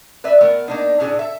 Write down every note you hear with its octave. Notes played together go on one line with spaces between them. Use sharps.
B4 D5 E5
A3 B3 A#4
A#3 D4 D#4
A2 A3 D4 G#4 D5
A4 E5